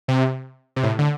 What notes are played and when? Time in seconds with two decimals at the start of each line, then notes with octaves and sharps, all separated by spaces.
0.08 C3
0.76 C3
0.83 A2
0.99 D3